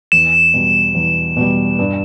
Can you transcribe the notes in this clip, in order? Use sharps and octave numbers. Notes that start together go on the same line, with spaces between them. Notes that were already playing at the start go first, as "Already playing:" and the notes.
E2 E7
B2 G3
E2
B2 G3
G2